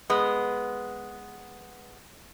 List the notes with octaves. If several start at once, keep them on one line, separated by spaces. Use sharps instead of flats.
G#3 B3